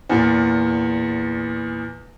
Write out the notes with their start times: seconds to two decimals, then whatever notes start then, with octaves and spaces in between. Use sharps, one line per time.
0.09 E2 A#2